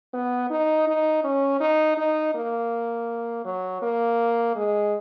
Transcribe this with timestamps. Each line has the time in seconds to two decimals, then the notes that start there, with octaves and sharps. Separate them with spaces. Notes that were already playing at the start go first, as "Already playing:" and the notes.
0.14 B3
0.50 D#4
0.88 D#4
1.24 C#4
1.60 D#4
1.97 D#4
2.35 A#3
3.45 F#3
3.82 A#3
4.55 G#3